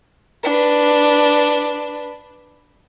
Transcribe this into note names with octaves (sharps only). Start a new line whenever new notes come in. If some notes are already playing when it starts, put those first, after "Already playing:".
D4 B4